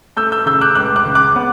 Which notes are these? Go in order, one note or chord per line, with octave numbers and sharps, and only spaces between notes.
A3 E6 G6
E6 G6
C#3 E6 G6
D6 F#6
C#2 D6 F#6
D6 F#6
C#3
D6 F#6
B3